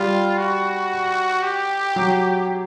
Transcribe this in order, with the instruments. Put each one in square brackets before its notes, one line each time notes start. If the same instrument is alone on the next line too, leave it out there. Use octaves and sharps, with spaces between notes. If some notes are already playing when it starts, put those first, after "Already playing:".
Already playing: [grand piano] G3 [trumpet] F4
[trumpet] F#4
G4
[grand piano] F#3